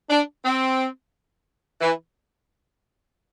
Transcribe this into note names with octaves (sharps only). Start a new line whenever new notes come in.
D4
C4
E3